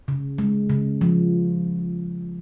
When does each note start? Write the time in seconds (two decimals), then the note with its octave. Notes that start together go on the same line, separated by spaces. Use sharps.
0.08 C#3
0.38 G#3
0.70 C#3
1.01 F3